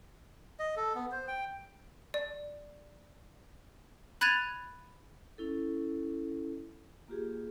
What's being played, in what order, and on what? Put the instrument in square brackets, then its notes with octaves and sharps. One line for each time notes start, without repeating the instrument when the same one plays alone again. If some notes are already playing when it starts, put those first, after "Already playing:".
[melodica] D#5
A4
B3
C5
G5
[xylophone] D5
B5 F#6 G#6 A6 D#7 F7
[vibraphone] C#4 E4 A4
A#3 F4 G4 G#4